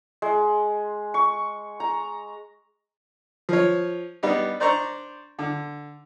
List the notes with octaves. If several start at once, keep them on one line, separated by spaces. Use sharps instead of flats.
G#3
C#6
A#5
F3 C#5
G3 B3 D4 D#4
D4 C5 D5 A#5 C#6
D3